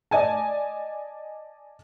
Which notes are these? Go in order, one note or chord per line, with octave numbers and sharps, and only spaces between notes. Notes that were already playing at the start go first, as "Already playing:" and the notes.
D5 D#5 G#5 A5